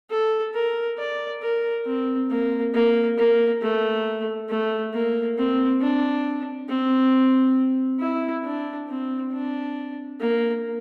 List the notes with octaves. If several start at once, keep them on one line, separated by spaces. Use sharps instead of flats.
A4
A#4
D5
A#4
C4
A#3
A#3
A#3
A3
A3
A#3
C4
D4
C4
E4
D4
C4
D4
A#3